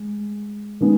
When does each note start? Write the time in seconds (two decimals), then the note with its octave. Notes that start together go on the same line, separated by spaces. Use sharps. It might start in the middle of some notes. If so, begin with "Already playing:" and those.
Already playing: G#3
0.81 D#3 G#3 B3